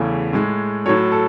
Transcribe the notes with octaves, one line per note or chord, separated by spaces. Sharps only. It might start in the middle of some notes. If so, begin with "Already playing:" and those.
Already playing: E2 C#3 E3 A3
A2 G#3
A2 F#3 A3 C#5
A4